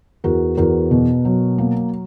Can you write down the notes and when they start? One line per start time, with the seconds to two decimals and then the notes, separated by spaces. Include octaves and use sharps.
0.24 E2 F#4 A#4
0.58 E2 F#4 A#4
0.91 B2
1.25 F#3
1.58 A#3